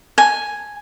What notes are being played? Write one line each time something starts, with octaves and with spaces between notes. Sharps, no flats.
G#5